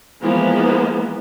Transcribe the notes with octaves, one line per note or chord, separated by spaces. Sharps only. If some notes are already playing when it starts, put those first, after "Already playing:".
E3 F3 G#3 A#3 B3